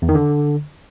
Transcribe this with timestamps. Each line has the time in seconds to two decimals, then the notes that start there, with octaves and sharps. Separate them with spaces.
0.02 E2
0.09 D#3
0.15 D3